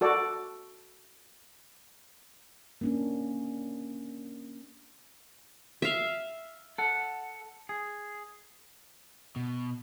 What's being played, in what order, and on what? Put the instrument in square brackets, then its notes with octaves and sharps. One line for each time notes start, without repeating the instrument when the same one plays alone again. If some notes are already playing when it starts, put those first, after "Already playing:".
[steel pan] F#4 A4 D5
[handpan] A#3 C#4 D4
[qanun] E5 F5
[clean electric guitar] A4 F#5
G#4
[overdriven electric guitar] B2